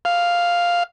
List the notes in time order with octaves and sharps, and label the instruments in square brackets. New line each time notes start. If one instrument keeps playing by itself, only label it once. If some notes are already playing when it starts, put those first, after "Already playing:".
[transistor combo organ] F5